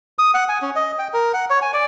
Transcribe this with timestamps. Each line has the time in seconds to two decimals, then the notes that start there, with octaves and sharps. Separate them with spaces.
0.19 D#6
0.34 F#5
0.49 G#5
0.62 C#4
0.76 D#5
0.99 G5
1.14 A#4
1.34 F#5
1.50 C#5
1.62 G#5
1.73 D5